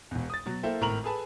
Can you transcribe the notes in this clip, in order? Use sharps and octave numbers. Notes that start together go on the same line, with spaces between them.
E1 E2
D#6 A6
B2 F#3
A#3 E4 A4 C5 E5 G5
G#1 A2 A#4 A#5 F7 F#7
G#4 A4 B4 G#5 A5 B5